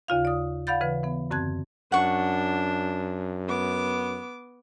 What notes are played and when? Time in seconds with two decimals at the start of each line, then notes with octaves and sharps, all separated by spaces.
0.08 D#2 C#3 F4 F5
0.25 D5 D#6
0.67 D5 F5 F#5 B5 G6 A6
0.81 C#3 E3 B4
1.03 E3 B3
1.31 F#2 D3 C4 A5 F#6 G#6
1.92 F#2 D4 F#5 C#6
3.48 B3 D6